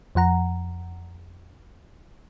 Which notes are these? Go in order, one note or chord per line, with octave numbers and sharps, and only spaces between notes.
F2 F3 F#5 A#5